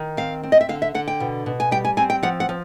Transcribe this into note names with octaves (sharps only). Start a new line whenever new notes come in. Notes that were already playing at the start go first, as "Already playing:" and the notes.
Already playing: D#3
C4 F5
C4
D#5
E5
D3 F5
E5
D3 F#5
G5
B2
B2
G#5
G3 G5
G#5
C4 G#5
G5
F3 F#5
F#5
F3